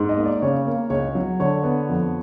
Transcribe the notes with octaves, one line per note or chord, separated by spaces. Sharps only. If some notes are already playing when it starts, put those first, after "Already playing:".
Already playing: G#2
D#5
A#3
D5
C#3 C#5
A#3
C#2 C#5
F#3
D3 C#5
B3
F2